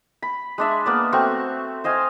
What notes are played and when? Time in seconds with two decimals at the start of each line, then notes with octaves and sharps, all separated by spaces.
0.22 B5
0.58 G#3 D4 E5
0.86 A#3 B3 D5
1.12 A3 C4 F#4 C#6
1.84 C5 D#5 F5 G#5